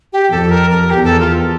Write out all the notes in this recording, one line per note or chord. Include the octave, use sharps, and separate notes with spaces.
G4
F2 A4
A#4
A#4
E2 G4
A4
F4